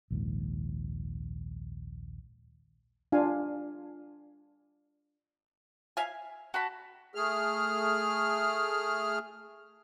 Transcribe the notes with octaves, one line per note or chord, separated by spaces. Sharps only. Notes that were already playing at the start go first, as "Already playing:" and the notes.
A#1 D#2 G#2
D4 F4 F5 G#5
E5 F5 G#5
F#4 A5 B5
A3 G#4 F6